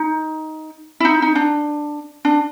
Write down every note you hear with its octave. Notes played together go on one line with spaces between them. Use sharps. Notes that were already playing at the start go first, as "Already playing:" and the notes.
Already playing: D#4
E4
D#4
D#4
D4
D4